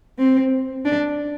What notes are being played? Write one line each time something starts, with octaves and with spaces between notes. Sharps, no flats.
C4
D4